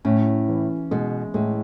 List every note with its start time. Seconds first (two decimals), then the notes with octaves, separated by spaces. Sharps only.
0.05 A2 C#4
0.48 E3
0.91 B2 G#3
1.34 A2 G#3